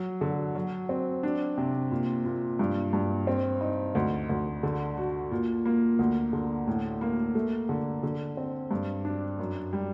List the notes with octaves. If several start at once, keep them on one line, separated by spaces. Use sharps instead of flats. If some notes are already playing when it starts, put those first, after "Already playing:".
Already playing: F#3
D3
F#3
C4
D4
C3
A#2
A#2
G2
G2
C4
D#4
D2
D2
D3
F#4
A#2
A#3
D2
D3
A2
A#3
A3
D3
D3
C4
G2
D4
F#2
G3